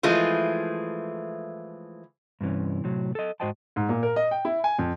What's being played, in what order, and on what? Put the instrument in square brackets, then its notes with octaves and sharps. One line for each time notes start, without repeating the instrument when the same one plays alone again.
[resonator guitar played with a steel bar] E3 F3 G#3 A3 F4
[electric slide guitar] G2 C3 E3 C#4
A2 C3 F#3
A4 D#5
G#2 F#4 C5 D#5 G5 A5
[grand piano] G#2
A#2
A#4
D#5
G5
E4
G#5
F2